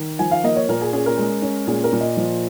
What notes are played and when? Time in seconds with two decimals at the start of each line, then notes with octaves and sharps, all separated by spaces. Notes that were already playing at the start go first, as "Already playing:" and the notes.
Already playing: D#3
0.19 F3 G#5
0.31 F5
0.44 A#3 D#5
0.56 C#5
0.69 A#2 A#4
0.81 G#4
0.93 C#4 G#4
1.06 A#4
1.17 G#3
1.42 C#4
1.67 A#2 G#4
1.84 A#4
1.93 A#2
2.01 D#5
2.17 F3